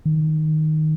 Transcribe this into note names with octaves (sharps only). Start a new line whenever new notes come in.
D#3